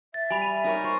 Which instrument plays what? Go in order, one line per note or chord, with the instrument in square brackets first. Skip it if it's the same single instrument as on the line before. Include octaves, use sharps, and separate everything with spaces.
[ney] E5 [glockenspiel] A6
[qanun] G3 [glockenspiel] G#5 B5 F7
[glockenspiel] D#7
[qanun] D#4 A#4 C#5
[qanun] C5 A#5 [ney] C#6